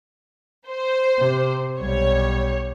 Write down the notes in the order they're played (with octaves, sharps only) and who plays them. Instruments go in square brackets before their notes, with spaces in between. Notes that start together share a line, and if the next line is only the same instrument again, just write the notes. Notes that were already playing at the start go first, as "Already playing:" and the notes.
[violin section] C5
[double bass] C3
[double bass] B1 G3 [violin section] C#5